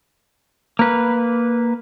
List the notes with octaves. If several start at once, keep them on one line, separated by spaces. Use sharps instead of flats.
A#3 B4